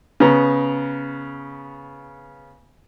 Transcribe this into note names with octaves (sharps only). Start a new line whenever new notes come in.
C#3 B3 A#5